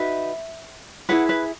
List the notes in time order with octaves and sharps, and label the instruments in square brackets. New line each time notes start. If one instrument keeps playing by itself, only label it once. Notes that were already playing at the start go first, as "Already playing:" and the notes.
Already playing: [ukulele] D#4 F#4 B4 E5
E4 G#4 B4 F#5
B4